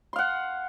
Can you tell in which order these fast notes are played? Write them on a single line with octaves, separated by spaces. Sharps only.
C6 F5 F#5